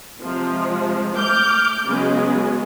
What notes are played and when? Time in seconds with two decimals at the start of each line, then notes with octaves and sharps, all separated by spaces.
0.21 C3 F3 G#3
1.16 A3 D6 F6 G6
1.85 C#3 F#3 G#3 B3